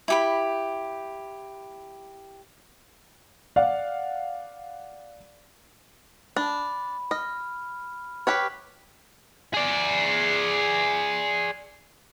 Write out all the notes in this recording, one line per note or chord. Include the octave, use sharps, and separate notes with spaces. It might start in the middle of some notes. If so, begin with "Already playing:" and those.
E4 G4 B5
D5 F5 F#5
D4 B5
D#5 F6
G4 B4 C#5 F6 B6
G#4 D5